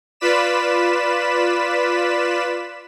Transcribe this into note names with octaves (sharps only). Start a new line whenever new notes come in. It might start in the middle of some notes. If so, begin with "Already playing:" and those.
F4 B4 D5 B5 B6 E7